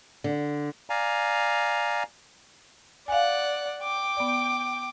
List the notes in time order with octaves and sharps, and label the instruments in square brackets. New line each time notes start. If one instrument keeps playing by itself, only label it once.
[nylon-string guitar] D3
[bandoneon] D5 F5 G#5 A#5
[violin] D5 F#5 [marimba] F5 G#5
[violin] G5 D6
[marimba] B3 D5